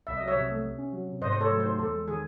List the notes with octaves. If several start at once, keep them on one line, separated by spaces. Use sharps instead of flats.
C2 E5
F#3 D#5
C#5 E5
C3
A3
C3
C#4
F#3
C3
G#2 C5 D#5
C5
A3 A4 C#5
F#3
C5
D#4
E2 A4
G#3
D#3 G#4